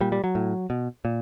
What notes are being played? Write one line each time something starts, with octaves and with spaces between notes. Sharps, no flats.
A#2 G3
G3
F#3
A2
B2
A#2